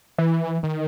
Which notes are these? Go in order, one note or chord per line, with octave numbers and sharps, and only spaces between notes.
E3
D#3